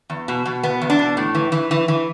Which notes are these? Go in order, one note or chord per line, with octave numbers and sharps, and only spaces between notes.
E2
B2
B2
E2 B3
E2
D4
B2
A2
E3
E3
E3
E3